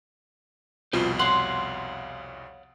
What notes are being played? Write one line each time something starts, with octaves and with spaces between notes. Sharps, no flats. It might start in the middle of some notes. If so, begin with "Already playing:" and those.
C2 F2 B2 F4 C5
C#5 F5 F#5 C6